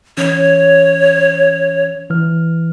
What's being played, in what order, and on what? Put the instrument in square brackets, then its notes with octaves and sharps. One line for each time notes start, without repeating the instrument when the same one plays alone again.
[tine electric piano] E3 C#4 [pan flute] C#5
[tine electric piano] E3 F6